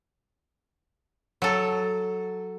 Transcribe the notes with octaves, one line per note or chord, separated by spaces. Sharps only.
F#3 A4